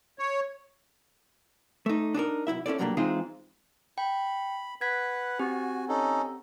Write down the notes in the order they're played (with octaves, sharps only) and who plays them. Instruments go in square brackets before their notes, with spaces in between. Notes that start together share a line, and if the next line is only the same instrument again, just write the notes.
[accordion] C#5
[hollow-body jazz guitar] A3 D#4
D4 D#4 G#4 A#4
B1 F2 E4 E5
C#4 E4 A4 D5
G2 B2 F#3 G3 A#3 D4
E3 G#3 C4 D#4 F4 G#4
[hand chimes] G5 [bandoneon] B5
[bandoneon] B4 F#5 [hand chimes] G#6 B6
[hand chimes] C4 G4 [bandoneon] F#4 G#5
[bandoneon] C#4 D#4 A4